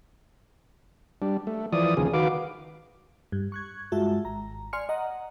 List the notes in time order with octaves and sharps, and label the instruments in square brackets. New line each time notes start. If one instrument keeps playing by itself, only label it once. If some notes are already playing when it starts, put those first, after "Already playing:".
[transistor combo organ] G3 D4
A3
E3 F3 D5 D#6
D#2 C#3 F3 G#4
D#3 F#4 B4 F5 D6
[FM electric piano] G2
C#6 F#6 G#6
G2 G#3 F4 F#4 E5 A5
G#1 A#5
D5 G#5 C6 F6 C#7
D#5 F#5 A#5